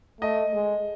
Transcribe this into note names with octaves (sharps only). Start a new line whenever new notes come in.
A3 D#5
G#3